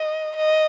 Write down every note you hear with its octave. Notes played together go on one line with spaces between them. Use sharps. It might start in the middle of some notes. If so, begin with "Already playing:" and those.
Already playing: D#5
D#5